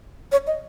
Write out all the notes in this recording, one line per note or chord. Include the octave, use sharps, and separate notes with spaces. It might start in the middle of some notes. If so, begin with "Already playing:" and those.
C#5
D#5